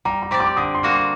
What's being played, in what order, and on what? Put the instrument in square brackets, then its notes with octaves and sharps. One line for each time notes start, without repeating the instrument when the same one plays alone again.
[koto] G3 [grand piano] A#5
[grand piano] A#5
[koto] C4 G4 D5
[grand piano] D6
[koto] D3 [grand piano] D#6
[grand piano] C6
[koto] G3 A#3 F#4
[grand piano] C6